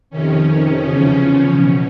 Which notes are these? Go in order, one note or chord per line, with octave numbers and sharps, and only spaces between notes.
F2 C3 D#3 C#4
E2 C#3 F3
E2 B2